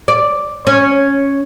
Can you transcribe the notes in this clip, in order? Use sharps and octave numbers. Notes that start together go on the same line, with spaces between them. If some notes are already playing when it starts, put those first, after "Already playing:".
D5
C#4